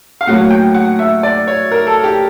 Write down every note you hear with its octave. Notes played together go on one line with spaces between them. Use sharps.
F5
A2 F#3 A#3 F#5
G5
F#5
E5
D5
C#5
A#4
A4
G4